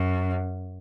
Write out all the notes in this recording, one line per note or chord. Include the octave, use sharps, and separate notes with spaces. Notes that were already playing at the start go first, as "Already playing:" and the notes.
Already playing: F#2